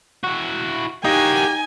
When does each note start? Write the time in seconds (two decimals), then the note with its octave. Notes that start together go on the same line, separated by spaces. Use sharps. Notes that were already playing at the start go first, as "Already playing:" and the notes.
0.24 E4 F#4
1.04 A#3 D#4 F#4 G4 G#5